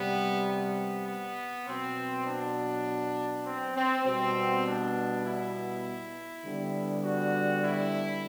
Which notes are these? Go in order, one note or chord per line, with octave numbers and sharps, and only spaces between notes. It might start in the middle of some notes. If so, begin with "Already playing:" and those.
Already playing: C3 G3 B3
B3
B3
B2 F#3 B3 C4
D4
C4
C4
B2 G3 B3 C4
D4
E4
D3 G3 B3
F#4
E4